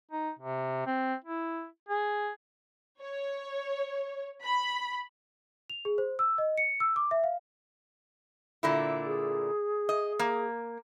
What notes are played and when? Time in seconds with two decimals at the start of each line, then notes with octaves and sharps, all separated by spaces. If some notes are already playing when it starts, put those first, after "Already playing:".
0.11 D#4
0.39 C3
0.87 C4
1.24 E4
1.89 G#4
3.00 C#5
4.42 B5
5.70 F7
5.85 G#4
5.98 C5
6.19 E6
6.38 D#5
6.58 C#7
6.80 E6
6.96 D6
7.11 E5
7.24 F5
8.63 A#2 D3 E4
9.05 G#4
9.89 D#5
10.19 A#3